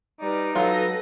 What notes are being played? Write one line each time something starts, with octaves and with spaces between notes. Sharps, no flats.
G3 D#4 B4 D5
F#3 F4 A4 B4 A#6